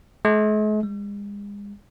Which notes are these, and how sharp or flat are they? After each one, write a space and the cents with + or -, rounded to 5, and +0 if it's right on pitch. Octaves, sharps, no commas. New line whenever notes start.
G#3 +45
G#3 -40